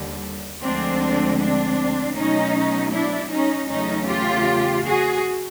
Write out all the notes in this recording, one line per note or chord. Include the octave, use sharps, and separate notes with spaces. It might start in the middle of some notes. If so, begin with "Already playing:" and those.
Already playing: D#2 D3 G3
D2 D3 F3 G#3 C4 D4
C4 D4
B2 F#3 A3 C#4 D#4
D4 E4
C#4 D#4
E2 C#3 F#3 A3 C#4 D#4
F4 G4
F#4 G#4